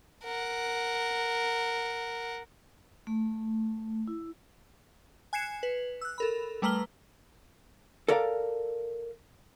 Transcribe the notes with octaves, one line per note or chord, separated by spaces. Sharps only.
A#4 F#5
A3
E4
G#5 F#6 G#6 C7 C#7 E7
B4
E6 F#6
A4 A#4 B5
G3 A3 B4 A#5 F6 G7
A4 A#4 D5 F5